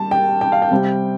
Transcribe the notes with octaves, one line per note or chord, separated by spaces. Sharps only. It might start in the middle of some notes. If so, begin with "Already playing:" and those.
Already playing: G3 A5
G5
G5
F5
G5
C3 G3 C4